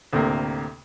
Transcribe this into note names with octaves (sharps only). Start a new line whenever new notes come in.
D2 A2 C3 A#3